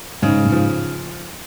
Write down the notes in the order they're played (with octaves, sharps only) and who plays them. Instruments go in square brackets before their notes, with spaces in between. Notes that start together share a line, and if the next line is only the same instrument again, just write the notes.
[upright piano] G#2 [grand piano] C#3
[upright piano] G#2
[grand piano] F3